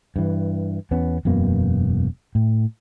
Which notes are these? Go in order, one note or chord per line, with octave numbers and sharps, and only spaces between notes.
G2 E3
E2 B3 C#4
E1 F#2 B2 A#3
A2